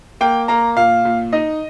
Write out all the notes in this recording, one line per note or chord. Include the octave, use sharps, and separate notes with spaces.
A#3 G5
A#3 A#5
A#2 F5
A#2
D#4 D#5